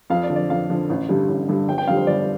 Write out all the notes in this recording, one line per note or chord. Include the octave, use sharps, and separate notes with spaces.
F2 F5
D5
D3 F3
D5
F2 F5
D3 F3
A1
G2 D3 G3
A1
G2 D3 G3
G1 G5
G5
F2 D3 G3 F5
C5
G1 D5